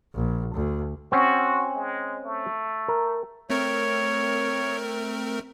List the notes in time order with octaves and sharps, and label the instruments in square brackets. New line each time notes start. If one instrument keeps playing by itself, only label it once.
[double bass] A#1
D2
[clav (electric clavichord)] C4 C#4 [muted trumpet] F#4
[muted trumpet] G#3
A3
[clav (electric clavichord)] A#4
[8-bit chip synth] A3 C4 A#4 [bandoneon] C#5